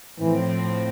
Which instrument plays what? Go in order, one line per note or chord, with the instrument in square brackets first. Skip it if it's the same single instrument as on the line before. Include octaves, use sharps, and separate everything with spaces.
[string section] A2 F3 C4 [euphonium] E3